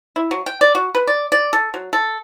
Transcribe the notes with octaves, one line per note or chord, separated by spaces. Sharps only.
E4
F#3
G5
D5
F#4
B4
D5
D5
A4
F#3
A4